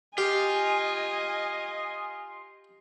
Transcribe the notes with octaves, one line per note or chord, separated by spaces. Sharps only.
F4 G4 D#5 G#5